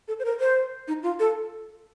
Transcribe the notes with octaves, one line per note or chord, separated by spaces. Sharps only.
A4
C5
A#4
C5
D#4
F4
A4